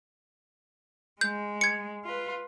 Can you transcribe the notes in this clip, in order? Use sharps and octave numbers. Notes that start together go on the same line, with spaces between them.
G#3 G6
G#6 C#7
F4 B4